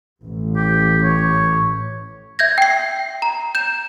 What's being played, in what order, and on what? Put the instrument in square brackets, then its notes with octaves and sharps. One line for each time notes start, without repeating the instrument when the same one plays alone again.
[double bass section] A1
[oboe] G4
C#5
[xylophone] E5 G6 G#6 A#6
G5 C7
A#5
G6 E7